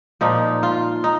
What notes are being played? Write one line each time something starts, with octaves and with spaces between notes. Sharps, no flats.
A#2 F3 D#4
F4
D#4